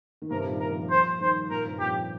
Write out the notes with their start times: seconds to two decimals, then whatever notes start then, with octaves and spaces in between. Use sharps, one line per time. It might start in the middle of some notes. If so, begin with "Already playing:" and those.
0.22 D#3
0.30 G2 C3 A#4
0.45 A#2 D#3
0.60 A#4
0.70 F3 A#3
0.80 F3 A#3
0.91 C5
1.20 D#3 G3 C5
1.50 A#2 D#3 A#4
1.65 G2 C3
1.79 F2 A#2 G4